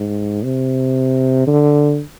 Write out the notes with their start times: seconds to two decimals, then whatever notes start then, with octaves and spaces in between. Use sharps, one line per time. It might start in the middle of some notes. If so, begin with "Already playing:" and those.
Already playing: G#2
0.44 C3
1.47 D3